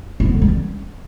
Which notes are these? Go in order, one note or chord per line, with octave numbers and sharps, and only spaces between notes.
E4
B3
D3
G3
C#4